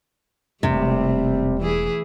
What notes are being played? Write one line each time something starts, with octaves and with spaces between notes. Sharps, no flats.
E1 E2 C3 G3 A3 C4
E3 E4 G#4